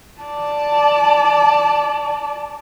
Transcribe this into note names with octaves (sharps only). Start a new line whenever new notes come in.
D5 A5